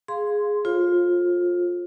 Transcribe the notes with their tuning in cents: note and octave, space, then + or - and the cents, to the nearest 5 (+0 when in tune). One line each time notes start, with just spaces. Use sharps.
G#4 +0 F5 +0 C6 -5
F4 +15 A4 +0 C5 +35